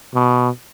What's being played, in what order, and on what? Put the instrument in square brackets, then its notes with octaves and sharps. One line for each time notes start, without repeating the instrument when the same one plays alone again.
[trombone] B2